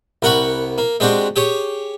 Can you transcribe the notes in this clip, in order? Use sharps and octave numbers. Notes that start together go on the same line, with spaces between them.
C2 A#4 F#5 B5 C#6
A#3
G#3 C4 D4 F#4 G4
G4 G#4 C#5